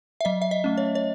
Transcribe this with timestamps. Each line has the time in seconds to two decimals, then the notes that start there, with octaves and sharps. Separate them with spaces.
0.21 E5
0.25 F#3 D#5
0.42 E5
0.51 D#5
0.64 A3 C#4
0.78 C#5
0.95 C#5